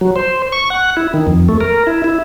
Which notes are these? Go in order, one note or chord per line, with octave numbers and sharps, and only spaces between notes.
F#3
C5
C#6
F#5
E4
D#3
F2
A3
A#4
E4
E4